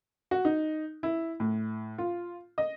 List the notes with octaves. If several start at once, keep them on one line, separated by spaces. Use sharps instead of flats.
F#4
D#4
E4
A2
F4
D#5